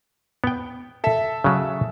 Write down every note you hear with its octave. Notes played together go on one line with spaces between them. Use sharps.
B3 G5
A4 E5
C#3 F#3